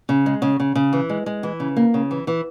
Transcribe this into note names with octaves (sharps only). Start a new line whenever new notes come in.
C#3
G#3
C#3
C#3
C#3
E3
G#3
G#3
E3
C#3
A#3
C#3
E3
E3